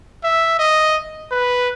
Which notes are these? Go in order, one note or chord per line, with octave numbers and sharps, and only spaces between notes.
E5
D#5
B4